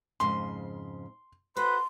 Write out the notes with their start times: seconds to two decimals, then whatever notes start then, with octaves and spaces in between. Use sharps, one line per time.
0.20 F2 G#2 C#3 C6
1.56 F#4 A4 B4 C5 C6